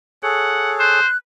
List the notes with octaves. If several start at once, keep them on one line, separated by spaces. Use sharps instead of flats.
G#4 A4 C#5 F#5
C5 F#6